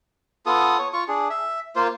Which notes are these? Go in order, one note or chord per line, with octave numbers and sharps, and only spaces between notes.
B3 F4 A4 D#6
C#5
F4 C#6
D4 G#4
E5
A#3 F4 C5